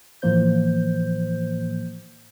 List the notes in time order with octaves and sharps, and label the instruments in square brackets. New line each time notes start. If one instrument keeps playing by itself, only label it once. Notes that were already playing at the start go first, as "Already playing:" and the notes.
[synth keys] A2 E3 F3 A#3 C5 G6